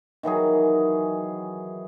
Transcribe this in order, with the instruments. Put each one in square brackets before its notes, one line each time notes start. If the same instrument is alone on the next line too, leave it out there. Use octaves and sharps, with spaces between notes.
[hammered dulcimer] D#3 E3 F#3 G#4